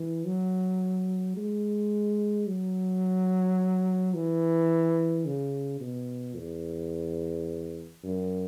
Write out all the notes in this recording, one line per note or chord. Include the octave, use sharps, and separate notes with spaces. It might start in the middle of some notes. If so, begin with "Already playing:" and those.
Already playing: E3
F#3
G#3
F#3
E3
C#3
B2
E2
F#2